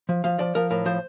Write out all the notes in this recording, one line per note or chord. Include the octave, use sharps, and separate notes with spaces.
F3
F3 F5
F3 D5
F3 A#4
A2 A#4
F3 C5